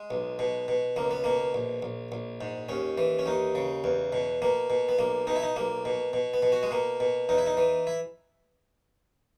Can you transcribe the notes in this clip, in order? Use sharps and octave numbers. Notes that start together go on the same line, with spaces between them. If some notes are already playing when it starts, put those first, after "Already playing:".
Already playing: G#3
B1
B2
B2
C#2 A#3
B3
B2 A#3
A#1
A#1
A#1
G#2
D#2 C#4
E3
C#4
D#2 D#4
C#3
E2
B2
B2 A#3
B2
B3
B1 A#3
B2 D#4
E4
D#4
B1 A#3
B2
B2
B3
B2
F#4
G#3
B2 A#3
B2
E2 D#4
E4
D#4
E3
E4